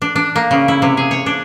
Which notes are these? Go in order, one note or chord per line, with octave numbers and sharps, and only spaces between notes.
D4
D4
A#3
C#3
E4
C3
G#4
C#5
D4